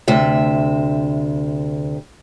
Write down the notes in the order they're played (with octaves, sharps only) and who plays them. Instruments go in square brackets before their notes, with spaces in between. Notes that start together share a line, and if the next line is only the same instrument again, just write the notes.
[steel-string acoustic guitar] D2 C3 E5